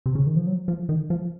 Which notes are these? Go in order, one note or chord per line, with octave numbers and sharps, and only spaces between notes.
C3
C#3
D#3
F3
F#3
F3
D#3
F3